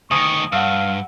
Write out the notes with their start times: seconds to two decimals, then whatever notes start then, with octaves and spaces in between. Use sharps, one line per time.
0.11 D2 D#3 G#5 C#6 D#6
0.52 G2 F5 F#5 E6